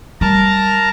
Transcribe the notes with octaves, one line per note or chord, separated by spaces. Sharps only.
G3 A#4 A5 A#5